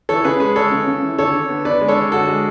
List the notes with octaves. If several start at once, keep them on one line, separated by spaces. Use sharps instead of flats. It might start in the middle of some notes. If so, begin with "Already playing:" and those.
E3 A4 C#5
C#3 G#4 B4
G#3 G#4 B4
G#3 A4 C#5
C#3
C#3
E3
D3 A4 C#5
D3
B3
D3 B4 D5
G#3
A4 C#5
D3
D3 F#4 A4
G#3